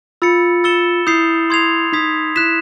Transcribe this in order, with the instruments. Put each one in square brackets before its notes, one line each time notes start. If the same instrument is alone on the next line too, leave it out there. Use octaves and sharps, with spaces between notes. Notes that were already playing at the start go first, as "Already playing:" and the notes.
[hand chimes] F4 [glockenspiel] B5 E6 A6 C#7
[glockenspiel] E6 A6 C#7 E7 G7
[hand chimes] E4 [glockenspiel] D#6 G6 C7 F7
[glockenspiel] C6 D#6 G#6 C7 F7
[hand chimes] D#4 [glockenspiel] D#6 G#6 B6
[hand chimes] E4 [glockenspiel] F#6 B6 E7